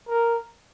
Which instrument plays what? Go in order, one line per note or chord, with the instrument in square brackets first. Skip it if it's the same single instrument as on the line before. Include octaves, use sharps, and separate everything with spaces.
[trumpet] A#4